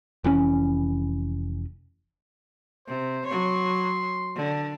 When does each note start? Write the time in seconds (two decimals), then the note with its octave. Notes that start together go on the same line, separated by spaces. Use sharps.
0.24 F1 E3 C4 C#4
2.88 C3 C5
3.26 F#3 C#5 C6
4.36 D3